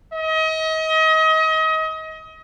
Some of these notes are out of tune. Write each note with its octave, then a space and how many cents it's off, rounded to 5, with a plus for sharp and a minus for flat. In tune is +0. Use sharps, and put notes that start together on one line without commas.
D#5 +35